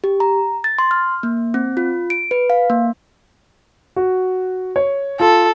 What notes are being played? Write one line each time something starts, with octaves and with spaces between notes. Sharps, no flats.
G4
A#5
A6
C6
F6
A#3
C4
F4
D7
B4
F5
A#3
F#4
C#5
F4 A4